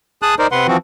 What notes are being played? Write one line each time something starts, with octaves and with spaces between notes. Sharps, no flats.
G#4 A5 D#6 F#6
D#4 A#4 C5 D5
C3 B4 F#5 C6
E3 F3 C4 F#4